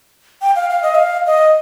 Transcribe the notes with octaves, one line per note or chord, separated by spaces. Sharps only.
G5
F5
F5
D#5
F5
D#5